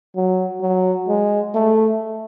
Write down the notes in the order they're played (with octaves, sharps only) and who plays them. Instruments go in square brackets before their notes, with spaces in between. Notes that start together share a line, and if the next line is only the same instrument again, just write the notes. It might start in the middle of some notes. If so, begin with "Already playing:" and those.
[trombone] F#3
F#3
G#3
A3